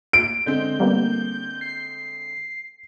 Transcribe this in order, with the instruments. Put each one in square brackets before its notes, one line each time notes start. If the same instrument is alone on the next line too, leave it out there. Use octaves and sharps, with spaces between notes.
[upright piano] D7
[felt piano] D3 G#3 C4 [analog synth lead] G6
[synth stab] G3 A#3 B3
[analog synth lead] C7